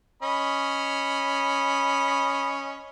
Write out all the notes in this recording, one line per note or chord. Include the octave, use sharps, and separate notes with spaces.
C#4 D#5 B5